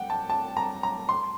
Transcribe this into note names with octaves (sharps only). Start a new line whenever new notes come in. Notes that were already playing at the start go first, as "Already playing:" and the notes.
Already playing: F#5 G5
A5
A5
A#5
A#5
C6